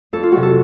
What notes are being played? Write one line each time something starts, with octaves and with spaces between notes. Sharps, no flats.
F2 A4
F4
C3 F#3 F#4
A4